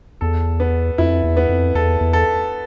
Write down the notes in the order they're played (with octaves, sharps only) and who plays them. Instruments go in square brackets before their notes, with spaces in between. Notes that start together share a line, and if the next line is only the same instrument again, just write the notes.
[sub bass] E2 [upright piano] A4
[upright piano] B3
[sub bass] F2 [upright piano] E4
[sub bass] E2
[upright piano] B3
[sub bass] F2
[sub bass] E2 [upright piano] A4
[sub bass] E2
[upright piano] A4